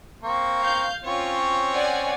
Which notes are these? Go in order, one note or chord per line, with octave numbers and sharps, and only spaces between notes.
A#3 C4 C#6
F5 G6
C4 C#4 F4 C#5
D5 F#5 G#5